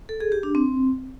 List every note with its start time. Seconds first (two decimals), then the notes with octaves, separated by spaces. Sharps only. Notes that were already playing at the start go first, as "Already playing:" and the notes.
0.09 A4
0.20 G#4
0.32 G4
0.43 D4
0.55 C4